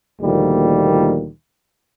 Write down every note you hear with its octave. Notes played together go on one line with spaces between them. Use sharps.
D2 A#2 D#3 F3 G3 A#3